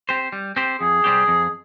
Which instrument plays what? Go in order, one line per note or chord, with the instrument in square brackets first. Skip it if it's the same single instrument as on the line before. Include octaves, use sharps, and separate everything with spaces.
[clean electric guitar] C4 G4 C5
G3
C4 G4 C5
[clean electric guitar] F2 [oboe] G#4
[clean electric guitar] C3 G3 C4 G4
F2